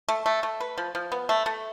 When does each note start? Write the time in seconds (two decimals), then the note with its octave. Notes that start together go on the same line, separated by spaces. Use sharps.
0.08 A3
0.26 A3
0.43 A3
0.60 B4
0.78 F3
0.95 F3
1.12 B3
1.29 A3
1.46 A3